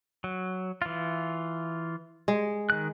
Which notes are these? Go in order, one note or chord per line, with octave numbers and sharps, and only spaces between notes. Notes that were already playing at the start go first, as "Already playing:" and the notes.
F#3
E3 F4
G#3
D#3 F#6